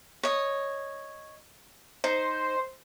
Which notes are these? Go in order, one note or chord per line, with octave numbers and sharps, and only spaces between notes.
C#5 D#5
D#4 C5